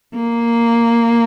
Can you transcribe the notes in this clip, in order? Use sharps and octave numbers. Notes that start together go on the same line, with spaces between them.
A#3